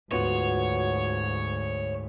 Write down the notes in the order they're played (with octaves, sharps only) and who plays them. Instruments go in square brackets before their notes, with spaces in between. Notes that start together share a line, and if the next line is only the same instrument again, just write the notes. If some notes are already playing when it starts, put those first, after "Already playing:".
[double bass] D2 G#2 [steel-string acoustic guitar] B3 F4 F#4 [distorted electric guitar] C#5